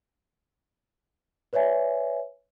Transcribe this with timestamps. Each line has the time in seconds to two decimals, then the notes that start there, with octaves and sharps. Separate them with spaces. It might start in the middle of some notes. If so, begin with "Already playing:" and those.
1.53 B4 C#5 D5 E5 G#5